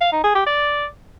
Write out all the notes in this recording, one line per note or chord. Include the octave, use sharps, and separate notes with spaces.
F5
D#4
G#4
G4
D5